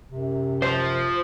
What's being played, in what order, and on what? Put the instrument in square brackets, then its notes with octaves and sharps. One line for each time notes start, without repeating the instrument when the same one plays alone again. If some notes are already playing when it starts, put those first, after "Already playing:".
[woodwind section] F#2 C3
[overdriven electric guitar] F3 [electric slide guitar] C5